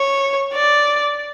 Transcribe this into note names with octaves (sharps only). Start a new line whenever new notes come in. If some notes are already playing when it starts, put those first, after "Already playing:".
Already playing: C#5
D5